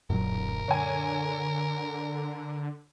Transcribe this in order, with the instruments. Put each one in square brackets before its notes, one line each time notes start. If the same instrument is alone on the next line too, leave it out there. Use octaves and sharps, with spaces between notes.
[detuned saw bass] D1 [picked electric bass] F#2 A#2 F#3 [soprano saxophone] A#4
[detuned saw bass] D3 [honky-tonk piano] C#5 G#5